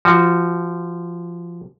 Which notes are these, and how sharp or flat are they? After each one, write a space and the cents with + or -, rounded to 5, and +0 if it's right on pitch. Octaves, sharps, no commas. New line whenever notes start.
F3 -20 F#4 +0